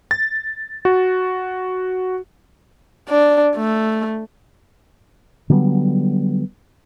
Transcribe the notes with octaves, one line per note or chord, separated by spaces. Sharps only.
A6
F#4
D4
A3
D3 F#3 G3 B3